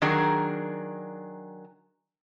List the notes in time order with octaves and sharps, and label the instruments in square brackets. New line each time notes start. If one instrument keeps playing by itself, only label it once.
[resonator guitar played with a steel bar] D#3 F#3 D4 G#4 A#4